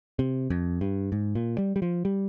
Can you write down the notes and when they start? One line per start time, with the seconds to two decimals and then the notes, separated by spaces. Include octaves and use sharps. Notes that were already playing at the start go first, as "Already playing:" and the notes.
0.19 C3
0.50 F2
0.81 G2
1.12 G#2
1.35 A#2
1.58 G3
1.76 G3
1.82 F3
2.05 G3